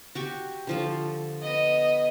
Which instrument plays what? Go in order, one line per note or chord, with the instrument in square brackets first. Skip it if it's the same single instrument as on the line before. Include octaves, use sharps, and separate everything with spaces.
[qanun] F#4 G4 C#6
D3 F3 A4
[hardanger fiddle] B3 D#5